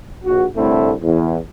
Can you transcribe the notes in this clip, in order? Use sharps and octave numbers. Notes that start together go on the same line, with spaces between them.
A#1 F#4
C2 A2 D3 A3 C4 E4
E2